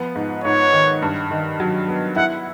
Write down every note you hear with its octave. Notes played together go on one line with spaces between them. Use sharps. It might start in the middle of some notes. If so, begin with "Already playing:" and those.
Already playing: F3 B3
G#2
G#2 C#5
D#3
G2
D#3
F#3
B3
E4 F#5